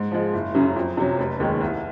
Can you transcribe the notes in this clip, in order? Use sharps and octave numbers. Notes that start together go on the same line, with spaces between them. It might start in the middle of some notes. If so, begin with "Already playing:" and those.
Already playing: G#2
F3 G#3
F#1
F#2 C#3 F#3
F2
C3 F#3 C#4
F1
D#2 D#3 G#3
C2